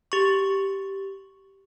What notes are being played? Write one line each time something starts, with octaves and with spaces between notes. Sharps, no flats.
G4 C#6